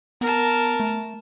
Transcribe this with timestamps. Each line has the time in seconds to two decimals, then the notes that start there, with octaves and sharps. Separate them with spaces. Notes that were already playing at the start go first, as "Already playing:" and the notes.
0.21 B3 A#4 A5
0.80 A3